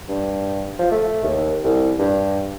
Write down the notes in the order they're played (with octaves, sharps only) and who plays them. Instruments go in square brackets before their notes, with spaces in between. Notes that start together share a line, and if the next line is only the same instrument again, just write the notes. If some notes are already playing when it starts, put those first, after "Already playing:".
[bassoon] G2
F3
A3
D#2
C2
G2